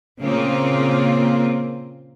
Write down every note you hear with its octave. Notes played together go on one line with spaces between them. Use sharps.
A#2 C#3 A#3 C4 F4 A#4